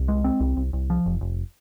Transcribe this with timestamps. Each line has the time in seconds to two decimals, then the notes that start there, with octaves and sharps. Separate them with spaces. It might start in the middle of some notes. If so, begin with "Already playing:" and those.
Already playing: C2
0.08 G#3
0.24 C4
0.40 C2
0.57 C2
0.73 C2
0.90 F3
1.06 F1
1.21 F1